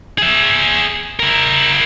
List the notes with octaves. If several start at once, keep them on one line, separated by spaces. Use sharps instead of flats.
G#4 E5
E4 A#4